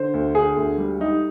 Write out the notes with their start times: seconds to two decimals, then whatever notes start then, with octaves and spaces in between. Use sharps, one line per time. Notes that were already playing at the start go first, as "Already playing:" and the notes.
Already playing: D3 C5
0.14 D2
0.35 D3 G#4
0.57 D2
0.78 G3
1.00 G3 D#4